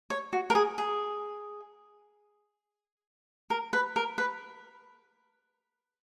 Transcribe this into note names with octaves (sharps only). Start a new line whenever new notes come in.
C#5
F#4
A#4
G#4
G#4
A#4
B4
A#4
B4